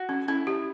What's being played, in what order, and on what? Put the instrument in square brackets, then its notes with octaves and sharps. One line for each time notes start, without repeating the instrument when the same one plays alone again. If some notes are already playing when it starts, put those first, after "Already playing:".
Already playing: [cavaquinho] F#4
[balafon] C#4
[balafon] C#4 [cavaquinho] E4
[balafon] G4